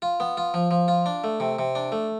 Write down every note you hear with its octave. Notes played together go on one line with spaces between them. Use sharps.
F4
B3
F4
F3
F3
F4
D4
A3
C3
C3
D4
A3